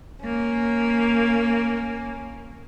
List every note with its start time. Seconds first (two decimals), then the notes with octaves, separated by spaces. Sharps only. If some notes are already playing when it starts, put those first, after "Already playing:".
0.25 A#3 C#4